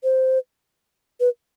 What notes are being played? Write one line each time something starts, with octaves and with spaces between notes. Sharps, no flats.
C5
B4